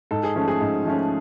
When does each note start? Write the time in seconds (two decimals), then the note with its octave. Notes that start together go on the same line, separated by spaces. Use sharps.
0.11 G#2 A4
0.23 G#4
0.35 F3 A3 C#4
0.48 G#4
0.61 G#2
0.85 F3 A3 C#4